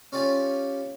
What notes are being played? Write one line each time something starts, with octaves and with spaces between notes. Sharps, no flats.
C#4 F4 G4 D5 G#5